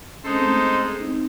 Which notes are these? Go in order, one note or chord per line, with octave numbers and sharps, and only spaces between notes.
G#3 C#4 D#4 A4 C5
C4
A3 C#4
C4 D#4